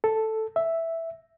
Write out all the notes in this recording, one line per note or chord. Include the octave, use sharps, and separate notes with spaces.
A4
E5